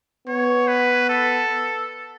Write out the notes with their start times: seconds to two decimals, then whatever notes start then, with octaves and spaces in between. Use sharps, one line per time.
0.27 B3 C#5
0.68 B4
1.09 A4